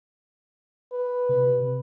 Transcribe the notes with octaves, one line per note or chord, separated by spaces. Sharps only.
B4
C3